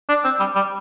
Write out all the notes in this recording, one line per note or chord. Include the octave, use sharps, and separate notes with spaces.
D4
C4
G3
G3